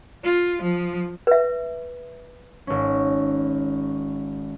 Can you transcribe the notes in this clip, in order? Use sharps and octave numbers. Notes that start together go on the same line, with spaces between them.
F4
F3
B4 E5
G#1 C#4